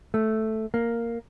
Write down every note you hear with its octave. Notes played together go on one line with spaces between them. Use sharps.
A3
A#3